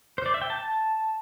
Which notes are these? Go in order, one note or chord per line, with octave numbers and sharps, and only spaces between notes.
C5
D5
E5
G5
A5